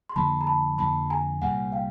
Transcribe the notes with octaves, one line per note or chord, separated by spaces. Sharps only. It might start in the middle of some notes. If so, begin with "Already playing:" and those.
C6
F2 D3 F3 A#3 A5 B5
A#5
A5 B5
F2 D3 F3 A#3 A5 B5
G#5 A#5
C2 A#2 G3 A#3 F#5 G#5
F5 G5